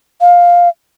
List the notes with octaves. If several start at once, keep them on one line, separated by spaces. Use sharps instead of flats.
F5